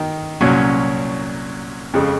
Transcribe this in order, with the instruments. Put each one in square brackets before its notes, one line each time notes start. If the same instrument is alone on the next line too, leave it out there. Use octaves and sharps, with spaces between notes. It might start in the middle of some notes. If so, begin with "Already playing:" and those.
Already playing: [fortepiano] D#3 D#4
C2 A#2 F#3 C#4
F2 C#3 G#3